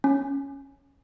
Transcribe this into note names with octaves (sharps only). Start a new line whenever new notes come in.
C#4